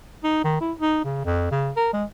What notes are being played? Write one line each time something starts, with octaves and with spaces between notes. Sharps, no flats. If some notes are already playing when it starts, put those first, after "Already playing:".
D#4
D#3
E4
D#4
C#3
F2
C#3
A#4
G#3